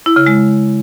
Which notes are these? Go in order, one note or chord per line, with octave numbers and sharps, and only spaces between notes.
E4
C#3
G#3